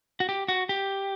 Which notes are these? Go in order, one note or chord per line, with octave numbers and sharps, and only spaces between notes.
F#4
G4
F#4
G4